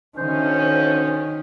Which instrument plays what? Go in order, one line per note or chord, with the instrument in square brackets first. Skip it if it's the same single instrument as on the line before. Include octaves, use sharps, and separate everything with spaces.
[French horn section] D2 C#4 [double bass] D#3 [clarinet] C5